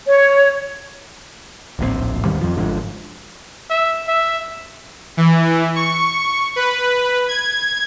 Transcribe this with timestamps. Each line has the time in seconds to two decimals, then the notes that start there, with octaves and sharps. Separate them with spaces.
0.06 C#5
1.79 D1 A#1 A2 C4
2.25 D#2 G#2 D#3 G3
2.41 F2 F3
2.57 G#1 G#2 D3 F3
3.70 E5
4.08 E5
5.17 E3
5.75 C#6
6.56 B4
7.28 G#6